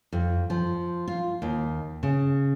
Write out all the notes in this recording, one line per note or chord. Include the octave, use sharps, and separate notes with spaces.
F2
F3
F4
D#2
C#3